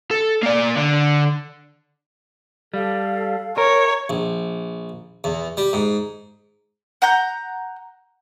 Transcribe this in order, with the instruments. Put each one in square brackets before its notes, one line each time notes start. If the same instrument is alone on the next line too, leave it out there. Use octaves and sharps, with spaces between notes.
[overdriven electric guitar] A4
A#3 D5
D3
[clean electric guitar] G3 [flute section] A4 F5
[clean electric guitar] A#4 [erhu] C#5
[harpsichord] A#1
E2
G3
G#2
[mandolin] F#5 A#5 G6